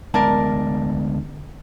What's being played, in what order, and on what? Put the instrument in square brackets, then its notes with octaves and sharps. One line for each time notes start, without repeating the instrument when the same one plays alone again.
[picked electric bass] D2 G#3 B3 [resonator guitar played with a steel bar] A#4 D5 A5